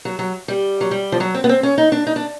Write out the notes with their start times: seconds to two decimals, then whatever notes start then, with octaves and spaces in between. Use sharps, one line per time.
0.05 F#3
0.19 F#3
0.48 G3
0.81 F#3
0.91 G3
1.12 F3
1.20 F#3
1.34 C4
1.44 B3
1.49 C4
1.63 C#4
1.78 D#4
1.92 D4
2.07 D#4
2.16 D4